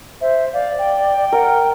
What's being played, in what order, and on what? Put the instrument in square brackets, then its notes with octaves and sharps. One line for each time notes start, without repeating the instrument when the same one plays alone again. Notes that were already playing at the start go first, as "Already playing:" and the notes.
[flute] C5 [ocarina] E5
[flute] D5 [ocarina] F5
[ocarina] G5
[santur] A#4 [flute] F#5